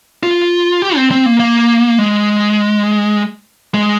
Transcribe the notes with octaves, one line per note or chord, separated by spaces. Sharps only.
F4
G4
C4
C4
A#3
A#3
G#3
G#3